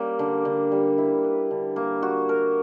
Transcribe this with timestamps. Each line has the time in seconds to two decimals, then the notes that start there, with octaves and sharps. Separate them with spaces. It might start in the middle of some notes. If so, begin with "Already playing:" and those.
Already playing: G3 A#3 C#4
0.19 D3
0.45 D3
0.72 G3
0.98 E4
1.24 B4
1.51 D3
1.76 A#3
2.02 F#4
2.29 A#4